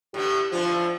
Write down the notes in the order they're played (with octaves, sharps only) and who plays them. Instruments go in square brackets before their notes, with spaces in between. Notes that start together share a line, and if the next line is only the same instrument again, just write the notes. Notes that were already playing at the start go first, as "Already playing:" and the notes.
[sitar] A2 D3 B3 [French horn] G4
[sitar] A2 D3 F4 [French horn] F3